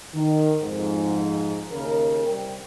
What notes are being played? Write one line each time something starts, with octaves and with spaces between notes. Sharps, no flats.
D#3
F2 G#2
D#2 C#3 A#4
C2 G5